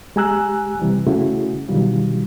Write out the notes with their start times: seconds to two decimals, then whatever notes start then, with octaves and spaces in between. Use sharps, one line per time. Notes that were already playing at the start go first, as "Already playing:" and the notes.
0.16 G#3 G4 G#5 A#5 E6 F#6
0.80 C3 E3 G3
1.07 C#3 A3 C#4 E4 F#4 G#4
1.68 B2 D3 D#3 F#3 G3 F4